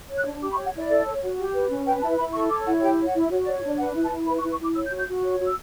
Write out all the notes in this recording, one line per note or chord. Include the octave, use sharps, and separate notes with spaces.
C#5
F#6
D4
G4 D6
B5
C#6
C#5
F#5
E4 D5
A4
C#5
F#4
G4
B4
C#4
B4 G5
E4 A5
E4 B5
A4 C#6
C#5 D6
E4 F#5
G4 G5
C#5
F#5
E4
F#4 C#5
D5
C#5
D4 D5
B4 F#5
E4
A5
E4
B4 B5
C#6
E4
C#6
E4 D6
C#5 E6
G6
F#4
G6
F#4
C#5
F#4
E6